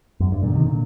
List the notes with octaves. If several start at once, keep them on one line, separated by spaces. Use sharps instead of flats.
F#2
G2
A#2 D3
C3 D#3
A#2 D3